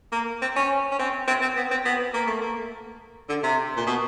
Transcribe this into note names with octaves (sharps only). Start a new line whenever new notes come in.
A#3
C4
C#4
C#4
C4
C4
C4
B3
C4
B3
A#3
A3
A#3
D3
C3
A#2
B2